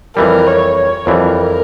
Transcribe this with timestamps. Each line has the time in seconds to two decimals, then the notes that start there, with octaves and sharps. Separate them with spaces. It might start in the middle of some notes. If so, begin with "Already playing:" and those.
0.16 F2 E3 G3 A#4
0.47 C#5
0.78 C#5
1.07 F2 E3 G3 A#4